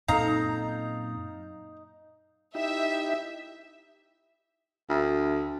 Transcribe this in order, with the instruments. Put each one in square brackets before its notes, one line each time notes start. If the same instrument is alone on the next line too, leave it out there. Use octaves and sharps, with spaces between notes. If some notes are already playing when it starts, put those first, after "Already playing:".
[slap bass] F#2 A#2 C4 [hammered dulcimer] D#4 [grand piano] A4 F5 [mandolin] A#5
[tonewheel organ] D#4 E4 G4 [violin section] E5
[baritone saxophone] D2